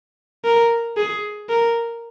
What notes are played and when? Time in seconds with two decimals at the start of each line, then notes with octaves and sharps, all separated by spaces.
0.45 A#4
0.97 G#4
1.50 A#4